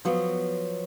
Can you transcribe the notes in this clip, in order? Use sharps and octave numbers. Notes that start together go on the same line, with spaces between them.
F3 F#3 B3